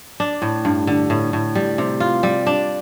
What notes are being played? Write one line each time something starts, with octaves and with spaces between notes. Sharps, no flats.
D4
A2
G2
D3
A2
A2
G3
C3
F4
G3
D4